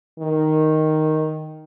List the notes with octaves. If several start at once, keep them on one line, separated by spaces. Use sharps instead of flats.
D#3